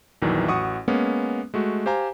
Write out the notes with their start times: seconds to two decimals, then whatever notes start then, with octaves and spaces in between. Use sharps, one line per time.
0.22 A#1 E2 D#3 E3 F#3
0.48 A1 F#4 F#5 C#6 D#6
0.88 G#3 A#3 B3 C#4
1.54 G#3 A3 F#4
1.86 G4 C5 F5 G#5 A#5